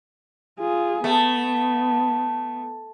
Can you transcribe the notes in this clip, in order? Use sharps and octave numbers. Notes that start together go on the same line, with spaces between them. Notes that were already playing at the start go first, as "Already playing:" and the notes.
F4 G#4
A3 B3